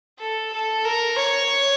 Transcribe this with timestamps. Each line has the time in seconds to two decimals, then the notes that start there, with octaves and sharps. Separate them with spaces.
0.19 A4
0.53 A4
0.85 A#4
1.18 C#5